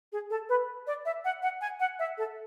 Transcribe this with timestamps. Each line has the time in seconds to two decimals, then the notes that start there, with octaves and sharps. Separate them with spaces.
0.12 G#4
0.30 A4
0.49 B4
0.87 D5
1.05 E5
1.24 F#5
1.42 F#5
1.61 G#5
1.79 F#5
1.99 E5
2.17 A4